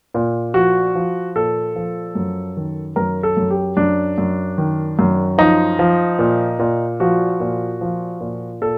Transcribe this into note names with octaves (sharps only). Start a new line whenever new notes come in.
A#2
F3 F#4
F3
A#2 A4
F3
F#2
D#3
F#2 A#4
A4
F#2
G4
F#2 D4
F#2
D#3
F#2
F3 D#4
F3
A#2
A#2
F3 F#4
A#2
F3
A#2
A#2 A4